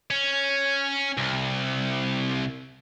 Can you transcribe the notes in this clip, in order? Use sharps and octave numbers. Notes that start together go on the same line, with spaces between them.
C#4
C2